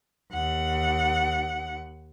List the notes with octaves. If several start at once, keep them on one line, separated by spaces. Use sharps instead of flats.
D#2 F#5